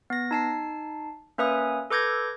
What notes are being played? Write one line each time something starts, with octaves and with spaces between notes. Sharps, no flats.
B3 A#6
D#4 A5 C7
A#3 C#4 B4 E5 G#5 D#6
A4 B4 D6 G6 G#6 A#6